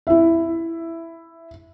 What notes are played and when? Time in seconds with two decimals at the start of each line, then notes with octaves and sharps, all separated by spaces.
0.07 E4 E5